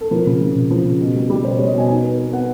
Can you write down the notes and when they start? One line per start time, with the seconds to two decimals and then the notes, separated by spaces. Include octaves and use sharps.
0.01 A4
0.11 F3 A#4
0.26 C#3
0.41 F3
0.55 C#3
0.70 F3
0.85 C#3
1.01 B2
1.15 G3
1.30 G3
1.44 B2 C5
1.56 G3 C#5
1.67 D#5
1.74 B2 G#5
1.88 D#4 G#5
2.03 B3
2.18 B3
2.33 B3 F#5